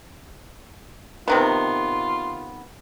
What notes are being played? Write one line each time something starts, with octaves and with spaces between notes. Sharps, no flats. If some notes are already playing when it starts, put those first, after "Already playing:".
C3 D#3 B3 F4